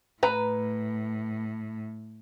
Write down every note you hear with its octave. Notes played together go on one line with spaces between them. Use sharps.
A2 B4 A#5